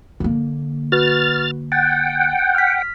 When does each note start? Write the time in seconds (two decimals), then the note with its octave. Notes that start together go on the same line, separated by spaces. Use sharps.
0.20 D3 A#3
0.92 F#4 B4 F6 A6
1.72 F#5 G5 A6
2.55 F6 B6